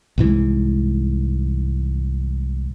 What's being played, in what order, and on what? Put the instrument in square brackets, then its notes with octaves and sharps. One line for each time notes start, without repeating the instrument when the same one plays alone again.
[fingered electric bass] C2 G#2 E3 G#3